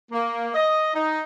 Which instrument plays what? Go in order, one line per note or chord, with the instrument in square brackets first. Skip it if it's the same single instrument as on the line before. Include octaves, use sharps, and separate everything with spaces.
[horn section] A#3
D#5
D#4